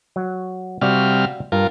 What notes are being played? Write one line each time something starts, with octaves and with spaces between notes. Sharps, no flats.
F#3
C3 G3 F#4 D5 F5 F6
G2 F4 A#4